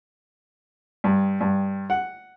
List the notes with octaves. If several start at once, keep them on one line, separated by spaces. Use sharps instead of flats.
G2
G2
F#5